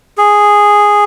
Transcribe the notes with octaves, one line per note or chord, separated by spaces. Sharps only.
G#4